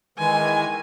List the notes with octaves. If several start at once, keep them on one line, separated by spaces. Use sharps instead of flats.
D#3 E3 G#3 G#5